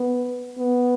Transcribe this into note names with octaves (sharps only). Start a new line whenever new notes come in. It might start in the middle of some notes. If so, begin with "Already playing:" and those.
Already playing: B3
B3